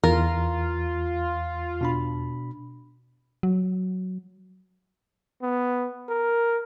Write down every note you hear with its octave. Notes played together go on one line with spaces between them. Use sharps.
E2 F4 A#4
B2 D4 B5
F#3
B3
A#4